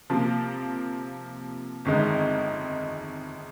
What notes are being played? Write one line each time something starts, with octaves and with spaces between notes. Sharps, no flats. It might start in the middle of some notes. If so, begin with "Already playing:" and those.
C3 F3 A#3
G1 F2 D#3 G#3 D#4